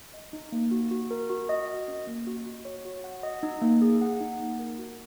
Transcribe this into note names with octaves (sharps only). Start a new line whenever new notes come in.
D#5
D#4
A#3
F#4
F#4
A#4
F#4
D#5
D#5
C#4
A#3
F#4
F#4
C#5
F#4
F#5
D#5
D#4
A#3
G#4
F#5
D#4
A#3
A#4
F#4